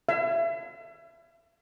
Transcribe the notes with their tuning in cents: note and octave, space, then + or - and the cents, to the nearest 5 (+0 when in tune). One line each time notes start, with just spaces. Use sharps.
E5 +30